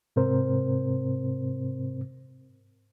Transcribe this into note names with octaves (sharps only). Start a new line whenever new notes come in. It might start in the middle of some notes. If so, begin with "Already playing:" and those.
G#2 C3 C4 A#4 C5